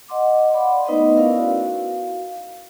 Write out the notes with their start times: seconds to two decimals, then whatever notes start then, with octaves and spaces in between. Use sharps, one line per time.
0.08 D#5 F#5 C6 D6
0.53 D5 F5 F#5 B5 C6 D6
0.86 A3 B3 D#4 B4 C5 D#5
1.17 C#4 E4 A#4 D5 F5
1.38 F#4 F5